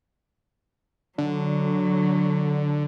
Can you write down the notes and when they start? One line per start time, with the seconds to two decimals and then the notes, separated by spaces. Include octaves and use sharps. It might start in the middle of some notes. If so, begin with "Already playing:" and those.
1.18 D3 F#3